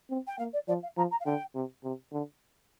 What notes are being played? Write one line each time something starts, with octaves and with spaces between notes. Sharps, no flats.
C4
G5
A#3 F5
D5
F3 D5
F5
F3 A#5
A#5
F5
D3 G5
C3
C3
D3